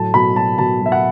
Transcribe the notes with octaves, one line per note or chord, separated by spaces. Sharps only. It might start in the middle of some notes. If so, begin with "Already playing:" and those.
Already playing: A2 F#3 A5
B2 B5
F#3 A5
B2 A5
F#3
E5
F#5